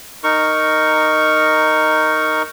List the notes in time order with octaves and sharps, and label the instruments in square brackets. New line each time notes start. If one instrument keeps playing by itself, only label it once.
[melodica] D#4 A#4 C#6